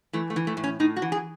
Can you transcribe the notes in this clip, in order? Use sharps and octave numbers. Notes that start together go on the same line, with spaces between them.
E3 A3
A3
E3
A3
A2
C#4
A2 D#4
F#4
E3
G#4